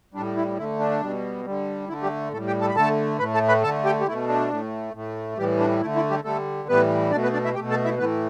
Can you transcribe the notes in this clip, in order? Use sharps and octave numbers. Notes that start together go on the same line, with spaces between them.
A2 G3 D4
E4
D3 A3 E4
D4
B2 G3
D3 G3
D3 A3 E4
G3 G4
A2 G3 A3 A4
G4 G5
A4 A5
B5
D3 A3 A4 A5
A2 A3 B4 B5
A4 A5
B4 B5
D3 A3 A4 A5
G4 G5
G4
B2 A3 E4
D4
A2 A3
A2 A3
A2 E3 G3 G4
D4
D3 A3 E4
E4
G3 G4
D3 G3 A3 A4
A2 E3 G3 B3 B4
B2 A3 D4 D5
B3 B4
D4 D5
E4 E5
B2 A3 G4 G5
A4 A5
E4 E5
A2 E3 A3 B3 B4